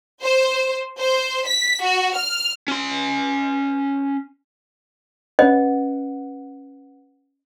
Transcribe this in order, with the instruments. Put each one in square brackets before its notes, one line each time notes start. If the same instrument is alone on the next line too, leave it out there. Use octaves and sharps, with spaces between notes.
[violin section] C5
C5
B6
F#4
F6
[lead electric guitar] C#4 C6
[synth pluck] C#4 B4 F#5 [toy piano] D#5